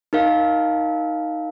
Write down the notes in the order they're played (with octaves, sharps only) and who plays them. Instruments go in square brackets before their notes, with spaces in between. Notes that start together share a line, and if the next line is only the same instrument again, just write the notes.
[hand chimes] D#4 A#4 F5